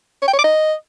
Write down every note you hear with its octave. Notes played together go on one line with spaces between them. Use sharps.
C#5
G5
C#5
D6
D#5